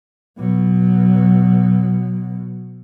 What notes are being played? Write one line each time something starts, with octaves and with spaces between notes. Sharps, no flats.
B2 F#3